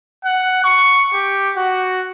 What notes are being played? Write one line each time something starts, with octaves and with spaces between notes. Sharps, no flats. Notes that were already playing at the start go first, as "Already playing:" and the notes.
F#5
C#6
G4
F#4